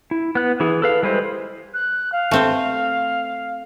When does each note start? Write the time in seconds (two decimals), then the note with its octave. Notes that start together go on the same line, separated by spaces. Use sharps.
0.11 E4
0.35 B3 F#6
0.60 E3 E4 G#4
0.82 A4 B4 F5
1.03 G3 G#3 E4 B4 C5
1.74 F#6
2.12 F5
2.31 A3 C4 C5